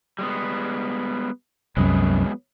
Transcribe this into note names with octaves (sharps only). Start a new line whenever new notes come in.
G3 G#3 B3
C2 F#2 F#3 G#3 B3